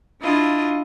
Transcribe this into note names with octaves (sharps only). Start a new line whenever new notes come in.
D4 E4 F4 D#5